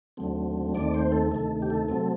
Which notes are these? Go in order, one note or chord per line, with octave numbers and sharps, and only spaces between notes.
D#2 D3 F#3 A3 C4
D#2 D#3 A3 C4 D5
C5
A4
D2 C3 D#3 A3 A4
G4
A4
C3 F#3 A3 C4 A4